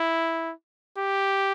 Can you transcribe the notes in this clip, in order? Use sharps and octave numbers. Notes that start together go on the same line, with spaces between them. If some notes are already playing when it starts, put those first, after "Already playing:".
Already playing: E4
G4